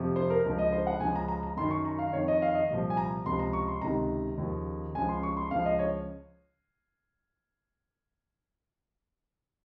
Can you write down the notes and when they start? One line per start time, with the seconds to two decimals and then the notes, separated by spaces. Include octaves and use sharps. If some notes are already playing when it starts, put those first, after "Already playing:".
Already playing: F2 C3 F3
0.16 C5
0.30 A#4
0.45 C#2 C#3 F3
0.58 D#5
0.72 C5
0.87 F#5
1.00 C#2 C#3 F3 G#5
1.16 A#5
1.28 A#5
1.43 A#5
1.56 F#2 D#3 C6
1.71 C#6
1.85 A#5
1.99 F5
2.13 F2 D#3 C#5
2.28 D#5
2.42 F5
2.55 D#5
2.70 C2 A#2 F3
2.90 G#5
2.97 A#5
3.26 C#2 C3 F3 C6
3.39 A#5
3.53 C#6
3.68 C6
3.81 C#2 C3 D#3 A#5
4.38 D#2 C#3 F3
4.95 C#2 C#3 F3 G#5
5.09 C6
5.23 C#6
5.37 C6
5.51 C#2 C#3 F3 F5
5.65 D#5
5.79 C#5